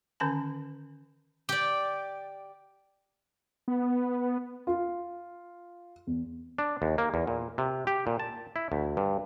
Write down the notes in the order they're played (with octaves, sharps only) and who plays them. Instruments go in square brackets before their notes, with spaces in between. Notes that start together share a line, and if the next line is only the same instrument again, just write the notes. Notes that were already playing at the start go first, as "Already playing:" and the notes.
[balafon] D3 D#3 C#4 A5 A#5
[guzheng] G4 D5
[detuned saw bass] B3
[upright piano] F4
E2
[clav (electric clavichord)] D4
D#2
A#3
E2
A#2
C3
G4
A#2
A5
E4
D2
G2